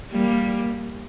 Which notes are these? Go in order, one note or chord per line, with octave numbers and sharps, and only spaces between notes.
G3 A#3